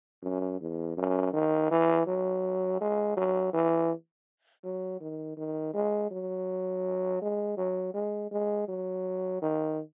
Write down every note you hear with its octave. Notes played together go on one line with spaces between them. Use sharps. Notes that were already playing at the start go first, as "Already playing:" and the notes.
F#2
E2
F#2
D#3
E3
F#3
G#3
F#3
E3
F#3
D#3
D#3
G#3
F#3
G#3
F#3
G#3
G#3
F#3
D#3